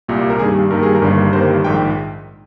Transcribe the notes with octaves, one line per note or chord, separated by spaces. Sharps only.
C2 A#2 G3 A#3
A#4
G2 D#3 G3 A#3 G#4
G2 D#3 G3 A#3 A#4
G#4
A#4
G1 G2 D#3 G3 A#3
G1 G2 D#3 G3 A#3 C5
A#1 G#2 D#3 G5